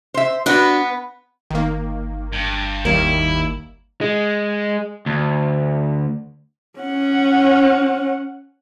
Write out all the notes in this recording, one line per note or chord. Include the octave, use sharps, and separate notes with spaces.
C5 E5
B3 D4 F#4 B4
G1 D#3 A#3
G2
D#2 D#3 G3 A#3 E4
G#3
D2
C#4 F#5